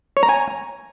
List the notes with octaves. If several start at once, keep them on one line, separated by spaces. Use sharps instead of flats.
C#5
A#5
G#5